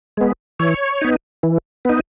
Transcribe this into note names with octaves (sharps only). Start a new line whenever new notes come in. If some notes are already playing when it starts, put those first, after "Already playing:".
G#3 B3
E3 C#5
B3 D#4
E3
B3 D#4